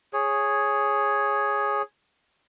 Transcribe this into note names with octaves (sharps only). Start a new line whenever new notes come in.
G#4 C#5